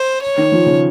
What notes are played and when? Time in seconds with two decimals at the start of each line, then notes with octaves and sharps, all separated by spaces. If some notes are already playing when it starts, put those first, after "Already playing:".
Already playing: C5
0.23 C#5
0.38 D#3
0.52 F3
0.66 C#3